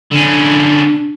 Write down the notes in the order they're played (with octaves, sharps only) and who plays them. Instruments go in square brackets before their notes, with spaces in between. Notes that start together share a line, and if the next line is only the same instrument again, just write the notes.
[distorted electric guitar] D3 C#4 [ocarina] D4